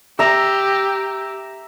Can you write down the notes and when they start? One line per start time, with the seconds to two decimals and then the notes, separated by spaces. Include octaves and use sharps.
0.19 G4 E5 A#5